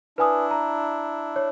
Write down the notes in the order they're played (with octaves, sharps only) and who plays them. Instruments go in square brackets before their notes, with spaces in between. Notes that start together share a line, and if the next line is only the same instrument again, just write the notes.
[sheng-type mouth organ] D4 E4 [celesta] B4 G#5 D#6
[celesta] A#5
C#5